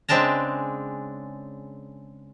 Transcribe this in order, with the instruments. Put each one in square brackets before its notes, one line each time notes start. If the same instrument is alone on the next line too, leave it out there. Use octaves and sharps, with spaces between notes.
[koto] C#3 G#3 C4 D4 A5 A#5